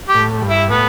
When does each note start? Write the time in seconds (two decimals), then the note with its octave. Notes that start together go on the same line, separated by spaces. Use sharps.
0.09 G4
0.15 A2
0.42 G2
0.49 E4
0.70 A2 B3